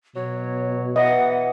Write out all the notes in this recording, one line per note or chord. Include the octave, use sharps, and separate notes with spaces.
B2 F#3 C#5
E3 D#5 F#5